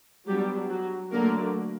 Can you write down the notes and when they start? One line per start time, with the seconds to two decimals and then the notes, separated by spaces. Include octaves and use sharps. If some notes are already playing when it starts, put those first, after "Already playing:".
0.27 F#3 G3 B3 D4 G4
0.69 F#3 F#4
1.12 D3 F#3 A3 A#3 D4 A#4